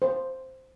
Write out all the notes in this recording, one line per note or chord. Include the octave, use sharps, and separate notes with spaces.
C5